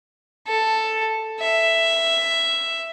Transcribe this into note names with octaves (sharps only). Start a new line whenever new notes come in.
A4
E5